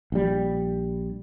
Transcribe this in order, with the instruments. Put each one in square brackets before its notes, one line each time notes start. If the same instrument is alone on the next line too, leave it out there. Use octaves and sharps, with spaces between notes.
[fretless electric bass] A#1 G3